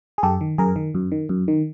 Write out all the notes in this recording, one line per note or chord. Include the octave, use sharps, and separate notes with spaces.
G#4
F#2 G4 A4
D#3
F#2 G#4 A#4
D#3
F#2
D#3
F#2
D#3